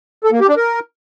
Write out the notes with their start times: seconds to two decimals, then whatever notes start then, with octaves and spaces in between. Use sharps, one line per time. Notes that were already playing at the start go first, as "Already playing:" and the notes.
0.24 A4
0.32 A#3
0.40 G4
0.49 D4
0.57 A#4